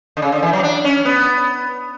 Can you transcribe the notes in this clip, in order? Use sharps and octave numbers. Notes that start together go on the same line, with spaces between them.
D3
C#3
D3
E3
F#3
D4
C#4
B3